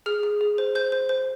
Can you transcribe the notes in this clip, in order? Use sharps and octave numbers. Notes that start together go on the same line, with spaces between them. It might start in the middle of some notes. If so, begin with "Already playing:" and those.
G#4 F6
G#4
G#4
C5
C5 G6
C5
C5